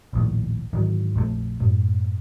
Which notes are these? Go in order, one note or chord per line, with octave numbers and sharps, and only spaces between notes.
A#1 D#2 A2
G#2 D#3 E3 F#3
A#1 F2 F3 A3
F#2 A2